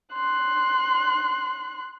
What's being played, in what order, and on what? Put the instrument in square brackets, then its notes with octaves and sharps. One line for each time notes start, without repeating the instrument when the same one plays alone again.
[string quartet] C6 F#6